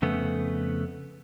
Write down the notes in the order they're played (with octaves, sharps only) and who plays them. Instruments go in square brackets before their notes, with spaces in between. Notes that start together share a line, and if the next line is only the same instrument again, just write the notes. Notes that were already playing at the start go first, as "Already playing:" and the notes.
[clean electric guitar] F2 C#3 A3 B3